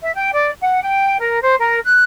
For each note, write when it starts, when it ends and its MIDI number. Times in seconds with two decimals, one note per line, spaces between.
0.02 0.12 76
0.14 0.29 79
0.33 0.51 74
0.61 0.80 78
0.81 1.17 79
1.19 1.42 70
1.43 1.55 72
1.59 1.80 70
1.84 2.03 90